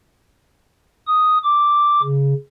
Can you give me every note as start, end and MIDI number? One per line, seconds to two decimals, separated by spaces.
1.07 1.38 87
1.44 2.02 86
2.03 2.34 49